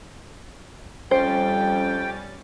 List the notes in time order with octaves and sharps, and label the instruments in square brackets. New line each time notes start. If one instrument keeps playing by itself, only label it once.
[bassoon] F2 [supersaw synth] G3 C#4 A6 [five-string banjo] C5 [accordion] G5